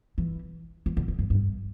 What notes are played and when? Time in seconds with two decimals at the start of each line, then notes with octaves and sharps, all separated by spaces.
0.18 E3
0.86 E3
0.97 D3
1.08 D3
1.19 G2
1.30 G2